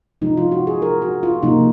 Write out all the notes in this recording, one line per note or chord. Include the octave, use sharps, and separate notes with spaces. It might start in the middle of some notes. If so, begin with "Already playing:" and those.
C3 F3 G#3 D#4
F4
F#4
G#4
A#4
F#4
F4
C3 F3 A#3 D#4